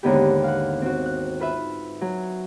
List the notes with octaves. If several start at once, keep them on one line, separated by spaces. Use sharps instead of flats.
D#2 G#2 D3 B3 E4 G4
F5 F#5
C4 F#4
F#6
F4 B4 E5
F#3